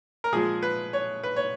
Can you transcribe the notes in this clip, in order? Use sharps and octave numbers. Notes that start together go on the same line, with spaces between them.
A#4
A#2 F3 G#3 G#4
B4
C#5
B4
C#5